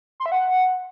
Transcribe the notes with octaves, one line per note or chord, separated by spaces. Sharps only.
C6
E5
F#5